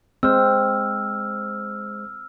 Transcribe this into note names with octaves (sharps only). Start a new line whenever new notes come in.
G#3 C4 C5 E6 F6